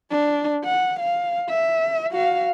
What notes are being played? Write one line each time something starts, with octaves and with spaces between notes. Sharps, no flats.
D4
F#5
F5
E5
F#4 F5